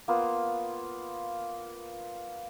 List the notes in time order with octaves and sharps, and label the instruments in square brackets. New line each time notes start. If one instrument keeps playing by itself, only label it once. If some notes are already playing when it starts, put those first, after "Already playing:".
[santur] A#3 B3 F4